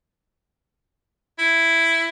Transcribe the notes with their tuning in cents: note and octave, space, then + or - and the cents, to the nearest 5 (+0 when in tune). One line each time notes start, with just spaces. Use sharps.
E4 +5